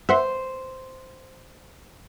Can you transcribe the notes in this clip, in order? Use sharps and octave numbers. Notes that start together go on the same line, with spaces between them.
C5 E5 F#5 C6